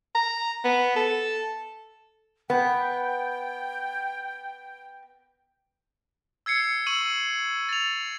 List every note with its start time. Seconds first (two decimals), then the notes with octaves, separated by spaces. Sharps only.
0.15 A#5
0.65 B3
0.96 A4
2.50 B3 G5
6.46 E6 G#6 C7 C#7
6.87 C#6 E6 D#7 F#7
7.69 A6 F7